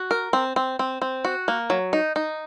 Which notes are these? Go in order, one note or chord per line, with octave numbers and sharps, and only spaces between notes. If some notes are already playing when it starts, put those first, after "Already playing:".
Already playing: F#4
A#4
C4
C4
C4
C4
F#4
A#3
F#3
D#4
D#4